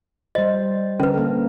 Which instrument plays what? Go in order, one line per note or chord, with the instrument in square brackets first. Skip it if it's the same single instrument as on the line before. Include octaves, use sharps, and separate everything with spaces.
[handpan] G3 C5 [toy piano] D#5
[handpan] D3 A#4 [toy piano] C#4 B4
[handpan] A#3 A4